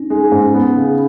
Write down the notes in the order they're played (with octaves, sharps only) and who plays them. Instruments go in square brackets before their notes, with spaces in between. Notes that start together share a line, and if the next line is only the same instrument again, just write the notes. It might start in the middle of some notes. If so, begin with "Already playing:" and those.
Already playing: [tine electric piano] C#4 D#4
[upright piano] G#3 [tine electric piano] D#4
[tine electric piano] C#4
[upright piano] G#2
[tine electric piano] C#4
[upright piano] B3
C#3